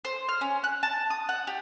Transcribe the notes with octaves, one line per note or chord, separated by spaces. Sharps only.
C5
F6
C#4
F#6
A5
D#6
F#5
G4